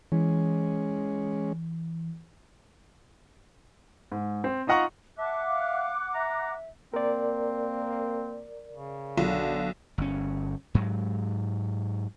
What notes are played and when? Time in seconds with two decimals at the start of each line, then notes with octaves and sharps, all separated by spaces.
0.12 E3 G#3 C#4
4.12 G#2
4.44 C4
4.67 D#4 F4 D#5 F#5 A#5 C#6
5.18 E5 F#5 A5 D6 F#6
5.47 F5
6.14 E5 A#5
6.94 A#3 C4 A#4 D5
8.71 C#3
9.18 B1 D3
9.98 G1 C#4
10.75 G#2 F#3